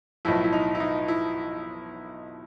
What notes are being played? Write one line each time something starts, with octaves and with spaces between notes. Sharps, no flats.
B1 A2 F3 E4
E4
D#4
E4
D#4
E4